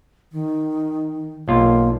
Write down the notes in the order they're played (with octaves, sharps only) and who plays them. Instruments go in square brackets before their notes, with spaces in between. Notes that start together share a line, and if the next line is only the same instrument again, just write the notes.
[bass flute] D#3
[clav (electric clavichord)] B1 F4 [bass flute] A#3